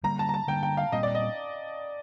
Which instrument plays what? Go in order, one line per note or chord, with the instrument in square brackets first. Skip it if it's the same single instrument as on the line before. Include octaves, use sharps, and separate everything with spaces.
[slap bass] D3 G3 A#3 [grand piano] A#5
[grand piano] A5
A#5
A5
[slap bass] D3 G3 A#3 [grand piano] G5
[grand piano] G5
F5
[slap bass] A#2 G3 C4 [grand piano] D#5
[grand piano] D5
D#5